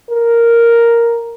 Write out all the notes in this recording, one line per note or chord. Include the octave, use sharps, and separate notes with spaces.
A#4